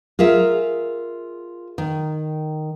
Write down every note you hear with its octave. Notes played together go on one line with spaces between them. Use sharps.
F4 G#4 A#4 E5
D#3